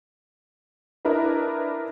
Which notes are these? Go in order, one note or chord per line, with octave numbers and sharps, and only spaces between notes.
D4 E4 A#4 B4 D#5